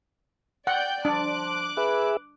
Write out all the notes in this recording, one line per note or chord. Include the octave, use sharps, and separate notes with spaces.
D5 F#5 G5 G6
F3 D4 D6 F#6
G#4 B4 E5